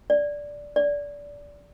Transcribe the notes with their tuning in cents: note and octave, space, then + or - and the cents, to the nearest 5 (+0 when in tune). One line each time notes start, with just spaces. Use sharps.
D5 -5
D5 -20